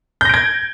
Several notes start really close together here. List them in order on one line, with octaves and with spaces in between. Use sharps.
G6 A#6 D7 G#6